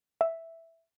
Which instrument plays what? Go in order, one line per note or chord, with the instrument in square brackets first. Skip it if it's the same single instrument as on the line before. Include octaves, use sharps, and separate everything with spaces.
[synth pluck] E5